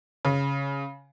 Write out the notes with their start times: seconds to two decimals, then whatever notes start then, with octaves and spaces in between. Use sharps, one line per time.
0.25 C#3